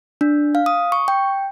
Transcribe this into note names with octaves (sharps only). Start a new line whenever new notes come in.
D4
F5
D#6
C#6
G5